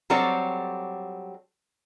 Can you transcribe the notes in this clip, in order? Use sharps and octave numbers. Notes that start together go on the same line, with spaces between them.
F#3 G3 C4 A4 C#5 D5